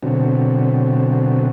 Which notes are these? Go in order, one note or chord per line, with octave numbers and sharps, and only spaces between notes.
B2 D3 F#3 C4